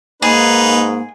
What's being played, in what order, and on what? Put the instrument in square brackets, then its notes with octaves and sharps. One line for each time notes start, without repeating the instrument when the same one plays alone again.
[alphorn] G#2 [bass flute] A#3 [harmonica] D#4 B4 [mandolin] G#4